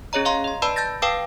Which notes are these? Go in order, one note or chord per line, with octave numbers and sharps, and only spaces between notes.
C#4 G#4 C#5 D#5 A#5
D#5 F5 A#5 C6
D#5 C6
B4 D5 A5 B5 E6
A5 G6 A6 A#6
B4 F5 G5 A5 D6 D#6